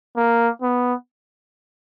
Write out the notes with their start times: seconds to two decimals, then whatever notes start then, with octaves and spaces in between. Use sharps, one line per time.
0.17 A#3
0.62 B3